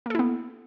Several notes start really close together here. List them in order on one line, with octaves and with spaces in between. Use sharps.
A#3 A4 E4 B3